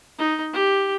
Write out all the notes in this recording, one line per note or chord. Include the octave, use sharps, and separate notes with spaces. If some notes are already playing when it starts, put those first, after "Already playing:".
D#4
G4